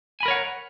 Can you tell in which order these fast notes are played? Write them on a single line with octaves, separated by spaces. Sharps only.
G#5 B5 A#4 C#5 F#5